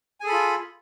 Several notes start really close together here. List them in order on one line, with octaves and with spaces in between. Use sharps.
G#5 G#4 A4 B5 F4